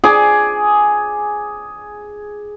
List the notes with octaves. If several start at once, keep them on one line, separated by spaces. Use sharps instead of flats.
G#4 D6